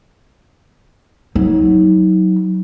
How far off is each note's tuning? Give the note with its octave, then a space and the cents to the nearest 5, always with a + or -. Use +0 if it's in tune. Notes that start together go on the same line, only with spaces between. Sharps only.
F#3 +0 D#4 +30